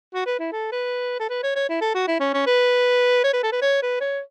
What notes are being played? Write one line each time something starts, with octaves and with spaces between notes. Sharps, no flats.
F#4
B4
E4
A4
B4
A4
B4
C#5
C#5
E4
A4
F#4
E4
C#4
C#4
B4
C#5
B4
A4
B4
C#5
B4
C#5